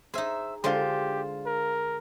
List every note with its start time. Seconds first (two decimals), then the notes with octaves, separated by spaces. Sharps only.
0.14 D#4 G#4 C5 E5
0.64 D3 G#3 F4 G4 C5
1.46 A#4